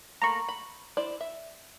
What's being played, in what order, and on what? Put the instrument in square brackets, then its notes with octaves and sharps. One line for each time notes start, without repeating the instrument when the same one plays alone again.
[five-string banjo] A3 A#3 B5 [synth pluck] A#5 C#6
[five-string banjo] B5
E4 C5 D5
E5